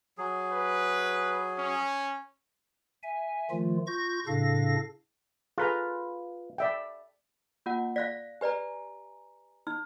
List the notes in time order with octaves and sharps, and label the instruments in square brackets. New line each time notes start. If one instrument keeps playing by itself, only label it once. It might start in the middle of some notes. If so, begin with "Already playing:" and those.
[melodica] F#3 G#4
[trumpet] B4
C#4
[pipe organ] E5 G#5
D#3 F3 A3 F4
F4 C#6 G6 A#6
A2 C#3 D4 A4 F5 A#6
[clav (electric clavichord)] F4 B4 [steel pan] G#4 A4 A#5
[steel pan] D5 E5 G5
[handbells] A#3 F4 F#5
[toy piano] D5 F5 [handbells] F#6 A#6 B6
[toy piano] G4 B4 D5 [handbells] G#5 A#5
[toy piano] D#4 [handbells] F6